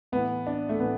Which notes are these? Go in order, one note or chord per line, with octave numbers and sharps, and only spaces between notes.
A2 E3 B3
D4
A3
A2 E3 B3